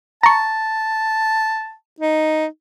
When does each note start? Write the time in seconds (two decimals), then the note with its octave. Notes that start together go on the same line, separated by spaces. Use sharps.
0.23 A5 A#5 C#6
2.00 D#4